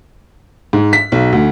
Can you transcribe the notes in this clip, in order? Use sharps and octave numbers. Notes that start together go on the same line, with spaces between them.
G#2
B6
B1
D2